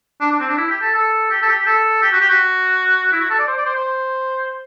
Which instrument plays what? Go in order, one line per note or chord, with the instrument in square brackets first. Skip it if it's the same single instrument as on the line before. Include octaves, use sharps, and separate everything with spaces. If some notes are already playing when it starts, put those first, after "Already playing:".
[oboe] D4
D4
C4
D4
E4
G4
A4
A4
G4
A4
G4
A4
G4
F#4
G4
F#4
E4
F#4
A4
D5
C5
D5
C5
C5